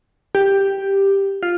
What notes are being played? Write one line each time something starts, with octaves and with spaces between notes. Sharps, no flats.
G4
F4